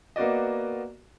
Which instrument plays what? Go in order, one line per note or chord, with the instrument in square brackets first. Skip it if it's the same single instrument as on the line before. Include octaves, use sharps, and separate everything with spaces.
[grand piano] A#3 B3 F#4 D5 D#5